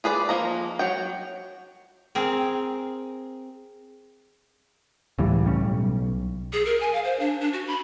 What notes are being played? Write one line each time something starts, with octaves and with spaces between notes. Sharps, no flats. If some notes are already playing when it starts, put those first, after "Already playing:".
F4 G#4 B4 D5
F3 A#3 A#5
F#3 F#4 G5
C4 G#4 A#4
C#2 A2 E3 G3
A1 G3 C#4
B1
G#4
A#4
G#5
F5
C5
D4
D4
F#4
B5